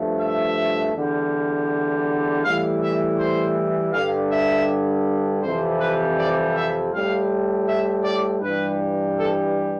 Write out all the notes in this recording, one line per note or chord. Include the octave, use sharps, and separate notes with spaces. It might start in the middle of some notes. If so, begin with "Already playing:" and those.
Already playing: G2 F3 A3
E5
E2 D3 G3
A2 E3 G3 F5
E5
C5
G2 D3 G3 F5
E5
F2 C3 E3 G3 C5
B4
D5
E5
A2 G3 F5
E5
D5
G2 E3 G3 B4
A4